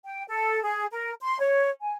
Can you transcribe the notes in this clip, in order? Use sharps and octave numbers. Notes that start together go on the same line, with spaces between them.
G5
A4
G#4
A#4
C6
C#5
G#5